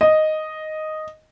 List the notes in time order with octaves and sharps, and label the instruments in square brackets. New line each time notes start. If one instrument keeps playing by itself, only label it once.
[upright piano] D#5